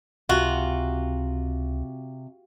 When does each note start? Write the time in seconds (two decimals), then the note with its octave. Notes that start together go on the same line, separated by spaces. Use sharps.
0.29 C#2 C3 F4 F#4